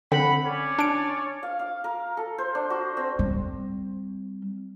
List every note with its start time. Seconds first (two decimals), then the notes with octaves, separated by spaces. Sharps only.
0.12 D3 C4 F#5 B5
0.45 C#4 C#5 D5
0.79 D4 D7
1.43 F5
1.59 F5
1.84 A#4
2.17 A4
2.38 C5
2.55 D4
2.70 F#4
2.97 C4
3.19 G3 C4